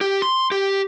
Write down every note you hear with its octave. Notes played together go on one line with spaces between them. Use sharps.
G4
C6
G4